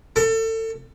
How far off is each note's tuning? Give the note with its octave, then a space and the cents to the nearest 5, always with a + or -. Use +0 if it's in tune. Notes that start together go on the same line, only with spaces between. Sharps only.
A4 +30